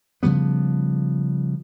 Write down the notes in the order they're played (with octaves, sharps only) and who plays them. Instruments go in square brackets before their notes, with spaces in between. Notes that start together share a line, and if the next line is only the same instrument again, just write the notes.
[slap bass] C#3 F3 G3 B3